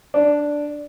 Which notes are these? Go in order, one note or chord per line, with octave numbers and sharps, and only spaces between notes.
D4